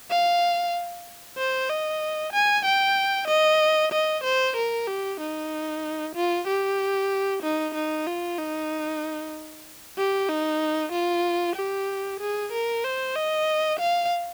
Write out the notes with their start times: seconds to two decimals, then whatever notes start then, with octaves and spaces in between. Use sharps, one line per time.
0.11 F5
1.38 C5
1.70 D#5
2.33 G#5
2.65 G5
3.28 D#5
3.92 D#5
4.24 C5
4.57 A#4
4.87 G4
5.21 D#4
6.16 F4
6.48 G4
7.43 D#4
7.75 D#4
8.07 F4
8.39 D#4
9.98 G4
10.29 D#4
10.93 F4
11.56 G4
12.20 G#4
12.53 A#4
12.84 C5
13.16 D#5
13.80 F5